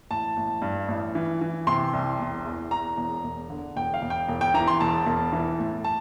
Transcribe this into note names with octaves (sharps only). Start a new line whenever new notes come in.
A1 A5
A1
G2
A1
E3
E3
C3 C6
C2
E1
E2
E2 A#5
E1
E1
D3
E1 G5
F5
E1
G5
E1
G5
E3 A#5
C6
E1 A5
E1
E3
A2
A5